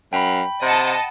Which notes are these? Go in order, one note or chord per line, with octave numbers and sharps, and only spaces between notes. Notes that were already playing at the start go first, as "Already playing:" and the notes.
F#2 G5 B5
C3 D#5 F#5 A5